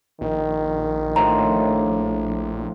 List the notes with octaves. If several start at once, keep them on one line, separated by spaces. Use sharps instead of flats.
A#1 D#3
A2 F3 D4 A#5